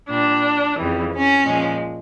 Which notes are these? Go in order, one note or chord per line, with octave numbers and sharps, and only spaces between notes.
A#2 G3 D4
F2 C#3 E3 G3
C#4
A#2 F3 G#3